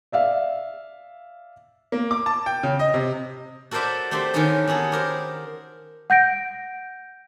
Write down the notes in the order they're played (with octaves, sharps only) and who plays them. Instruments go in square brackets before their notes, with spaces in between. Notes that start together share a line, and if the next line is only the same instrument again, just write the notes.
[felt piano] D5 E5 F5
[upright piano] A#3
D6
A5
G5
C#3
D#5
C3
[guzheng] F#4 A4 A#4 C5 D5 E5
A3 C4 G4 C5 C6
D#3 E3 B3 C#4 D#4 D#5
B3 F#4 G#4 A4
G4 A#4 C5
[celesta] F#5 G6 A#6 D7